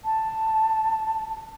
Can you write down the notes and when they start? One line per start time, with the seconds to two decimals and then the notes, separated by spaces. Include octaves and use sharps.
0.05 A5